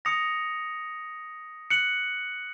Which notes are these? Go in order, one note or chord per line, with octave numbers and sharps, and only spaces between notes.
D#6 A#6 C#7 F7
F#6 C#7 F#7